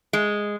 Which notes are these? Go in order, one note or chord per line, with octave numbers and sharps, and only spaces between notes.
G#3